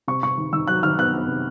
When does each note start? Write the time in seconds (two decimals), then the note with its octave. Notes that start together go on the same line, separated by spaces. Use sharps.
0.07 C3 C#6
0.23 C3 C#6
0.38 D#3
0.53 D#3 E6
0.68 F#3 F#6
0.83 D#3 F6
0.98 B3 F#6
1.13 B3
1.28 C3